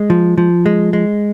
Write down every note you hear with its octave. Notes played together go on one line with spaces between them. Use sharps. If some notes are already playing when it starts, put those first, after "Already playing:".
Already playing: G#3
F3
F3
G#3
G#3